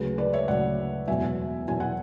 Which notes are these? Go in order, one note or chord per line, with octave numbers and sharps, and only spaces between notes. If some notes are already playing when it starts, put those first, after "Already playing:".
Already playing: D2 C#3 F#3 G#4 B4
B4 D5
C#5 E5
D2 C#3 F#3 D5 F#5
E2 B2 F#3 E5 G#5
E2 B2 F#3 G#5
F#5